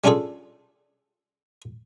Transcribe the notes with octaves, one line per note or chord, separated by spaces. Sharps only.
G3 C#4 D4 F4 G#4 A4